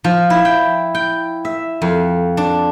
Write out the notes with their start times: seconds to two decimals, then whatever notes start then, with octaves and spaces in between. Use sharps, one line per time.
0.04 F3
0.30 E4
0.45 G5
0.95 G5
1.45 E5
1.82 F2
2.37 D4